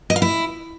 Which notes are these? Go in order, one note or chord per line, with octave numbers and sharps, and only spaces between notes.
D#5
F5
E4